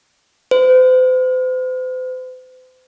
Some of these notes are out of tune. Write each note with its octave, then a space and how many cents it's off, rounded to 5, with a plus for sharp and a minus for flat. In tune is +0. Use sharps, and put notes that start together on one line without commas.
C5 -40